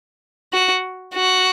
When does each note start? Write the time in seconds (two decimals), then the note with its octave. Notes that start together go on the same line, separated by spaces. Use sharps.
0.53 F#4
1.15 F#4